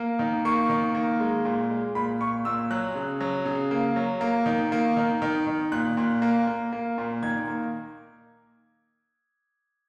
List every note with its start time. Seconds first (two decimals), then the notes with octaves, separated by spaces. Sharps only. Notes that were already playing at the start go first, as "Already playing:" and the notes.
Already playing: A#3
0.19 D#3
0.45 A#3 C#6
0.69 D#3
0.95 A#3
1.20 G#3
1.45 A#2
1.70 G#3
1.95 A#2 B5
2.21 A#2 C#6
2.45 A#2 E6
2.70 F#3 F#6
2.95 C#3
3.20 F#3
3.46 C#3
3.71 A#3
3.96 F#3
4.21 A#3
4.46 D#3
4.72 A#3
4.97 D#3
5.22 D#3
5.47 D#3
5.72 A#2 F#6
5.97 A#2
6.22 A#3
6.47 A#3
6.73 A#3
6.98 A#2
7.23 D#3 G#6
7.47 A#3